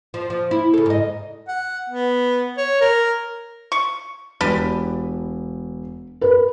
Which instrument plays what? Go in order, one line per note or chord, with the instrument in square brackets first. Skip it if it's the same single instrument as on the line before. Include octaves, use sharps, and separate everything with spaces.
[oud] F3
F3
E4
C#3 A4
G#2 D#5
[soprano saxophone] F#5
B3
C#5
A#4
[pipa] C#6
[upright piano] E1 [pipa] D4 G4 B4
[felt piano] A#4 B4